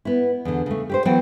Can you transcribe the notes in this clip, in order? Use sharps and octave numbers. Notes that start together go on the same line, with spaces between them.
B3 E4
E2 D3
C#3 A3
G4 B4 C5
E3 F#3 B3 C5 G5